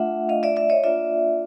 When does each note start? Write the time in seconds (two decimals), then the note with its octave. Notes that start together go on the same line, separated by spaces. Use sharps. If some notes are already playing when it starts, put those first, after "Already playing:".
Already playing: A3 D4 F4 E5 F#5
0.29 D#5 F5
0.43 D5 E5
0.56 D5 E5
0.69 C#5 D#5
0.84 A#3 D4 F4 D5 E5